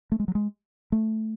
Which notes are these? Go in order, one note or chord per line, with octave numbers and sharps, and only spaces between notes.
A3
G#3
F#3
G#3
A3